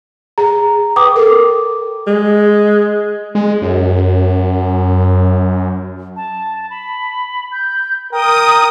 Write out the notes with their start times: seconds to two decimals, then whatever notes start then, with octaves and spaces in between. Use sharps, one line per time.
0.38 G#4 A#5
0.96 B4 G5 D6 D#6
1.16 A4 A#4
2.07 G#3
3.35 G#3
3.62 F#2
6.16 A5
6.70 B5
7.52 G6
8.12 A#4 G5 D#6